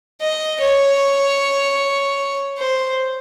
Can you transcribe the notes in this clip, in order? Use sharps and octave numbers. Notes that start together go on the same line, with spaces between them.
D#5
C#5
C5